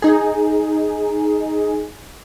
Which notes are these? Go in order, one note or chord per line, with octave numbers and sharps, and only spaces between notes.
D#4 G#4